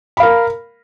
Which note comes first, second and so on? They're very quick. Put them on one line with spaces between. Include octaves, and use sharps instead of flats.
B5 F5 A#4